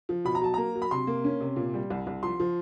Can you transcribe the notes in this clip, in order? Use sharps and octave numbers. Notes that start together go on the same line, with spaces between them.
F3
B2 B5
A#5
F#3 A5
A#3 A#5
F#3
B5
C3 C6
A#3
C#4
C3
A#2
G3
C2
C2
F3 C6
F3